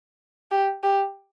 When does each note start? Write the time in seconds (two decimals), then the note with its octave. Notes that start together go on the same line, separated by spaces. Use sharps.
0.51 G4
0.83 G4